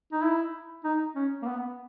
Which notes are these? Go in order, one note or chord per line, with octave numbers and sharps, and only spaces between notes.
D#4
E4
D#4
C#4
A#3
B3